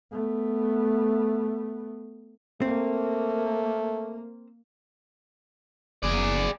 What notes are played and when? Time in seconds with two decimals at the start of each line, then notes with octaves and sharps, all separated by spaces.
0.12 A3 B3
2.62 A3 A#3 C4
6.03 F#1 G#4 D5